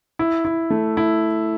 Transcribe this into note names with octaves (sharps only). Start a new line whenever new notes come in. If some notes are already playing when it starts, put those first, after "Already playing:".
E4
E4
A3
E4